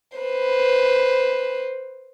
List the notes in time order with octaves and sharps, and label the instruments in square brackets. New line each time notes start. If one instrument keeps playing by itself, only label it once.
[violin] B4 C5